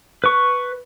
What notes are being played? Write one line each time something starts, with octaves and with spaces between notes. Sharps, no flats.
B4 C#6